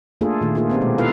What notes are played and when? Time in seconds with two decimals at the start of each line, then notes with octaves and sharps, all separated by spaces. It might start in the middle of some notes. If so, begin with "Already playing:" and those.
0.21 A3 A#3 D4 F4 G#4 A4
0.41 A#2 D#3 A3
0.55 A#3 F4 G#4
0.70 B3 C4 D#4 G4
0.81 B2 G#3
0.98 E4 F4 A4 B4 F5